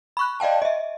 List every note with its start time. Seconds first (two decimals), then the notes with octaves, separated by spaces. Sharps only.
0.17 B5 C#6 F#6
0.40 D5 D#5 F5 G5 A5
0.62 D#5 E5